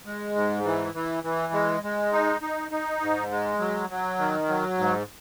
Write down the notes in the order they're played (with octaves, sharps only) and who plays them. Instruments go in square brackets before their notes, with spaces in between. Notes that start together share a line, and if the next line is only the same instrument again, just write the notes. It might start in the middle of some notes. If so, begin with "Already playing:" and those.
[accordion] G#3
G#2
E3
E3
E3
G#3
G#3
D#4
D#4
D#4
G#2
G#3
F#3
F#3
D#3
F#3
G#2